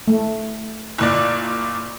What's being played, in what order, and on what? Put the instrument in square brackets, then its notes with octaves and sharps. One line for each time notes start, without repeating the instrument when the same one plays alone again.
[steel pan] A3
[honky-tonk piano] F#1 A#2 D5